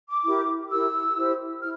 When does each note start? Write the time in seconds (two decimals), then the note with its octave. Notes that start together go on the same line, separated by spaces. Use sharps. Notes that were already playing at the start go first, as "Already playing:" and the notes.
0.09 D6
0.24 E4 G4 A#4
0.70 E4 G4 A#4 E6
1.16 E4 G4 C5
1.61 E4 F6